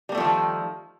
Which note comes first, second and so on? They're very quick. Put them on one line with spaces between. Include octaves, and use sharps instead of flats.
G3 A#3 A3 F3 D#3